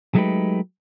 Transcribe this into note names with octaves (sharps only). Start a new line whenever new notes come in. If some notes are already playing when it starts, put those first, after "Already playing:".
F#3 G#3 A3 D#4 G4 B4